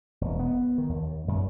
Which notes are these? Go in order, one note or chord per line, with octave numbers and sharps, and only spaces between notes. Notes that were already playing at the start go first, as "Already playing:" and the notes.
E1
B3
D#3
D#2
F#2